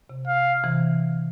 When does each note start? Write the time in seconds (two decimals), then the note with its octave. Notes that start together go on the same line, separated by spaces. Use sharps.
0.10 C3
0.27 F5
0.64 C3 E3